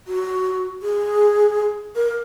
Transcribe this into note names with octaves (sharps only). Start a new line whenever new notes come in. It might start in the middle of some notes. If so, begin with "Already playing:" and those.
F#4
G#4
A#4